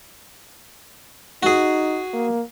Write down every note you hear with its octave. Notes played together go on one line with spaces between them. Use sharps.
D#4 F#4 G#4
A#3